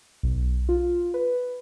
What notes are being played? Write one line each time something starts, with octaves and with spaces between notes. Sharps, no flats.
B1
F4
B4